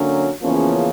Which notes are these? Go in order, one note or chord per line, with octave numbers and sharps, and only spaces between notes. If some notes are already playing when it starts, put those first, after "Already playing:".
Already playing: D3 F#3 A#3 C#4
E2 C#3 F3 A#3 C#4